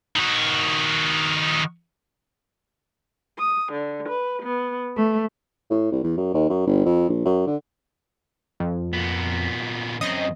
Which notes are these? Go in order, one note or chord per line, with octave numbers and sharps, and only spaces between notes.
D#3 F#4
D#6
D3
B4
B3
A3
A2
C2
E2
F#2
D#2
F#2
G1
F2
A#1
F#2
D3
F2
A#2 B3
F#2 C4 D#5